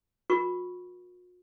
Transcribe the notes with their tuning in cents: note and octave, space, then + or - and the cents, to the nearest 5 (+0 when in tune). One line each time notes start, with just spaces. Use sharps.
F#4 -45 A#4 +35 C#6 +0